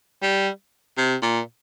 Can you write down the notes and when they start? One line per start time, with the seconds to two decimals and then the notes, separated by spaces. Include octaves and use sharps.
0.22 G3
0.98 C3
1.22 A#2